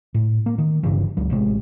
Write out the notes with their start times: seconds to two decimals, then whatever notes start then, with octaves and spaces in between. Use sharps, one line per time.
0.14 A2
0.46 A#3
0.58 D#3
0.83 G1 G2 C#3 E3
1.17 C#2 F#3
1.30 A1 C3 F3 G#3